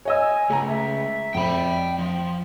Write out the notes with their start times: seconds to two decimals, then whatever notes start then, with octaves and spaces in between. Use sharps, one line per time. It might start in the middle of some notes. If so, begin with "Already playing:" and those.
0.05 C#5 D#5 G#5 E6
0.50 C#2 A3 A#5
0.68 E5
1.34 F2 G5 B5
1.98 F3